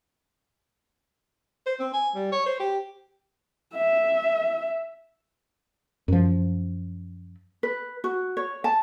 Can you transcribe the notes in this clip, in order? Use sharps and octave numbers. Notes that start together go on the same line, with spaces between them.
C5
C4
G#5
G3
C#5
C5
G4
E5
F#2 F3
B4
F#4
C#5
A5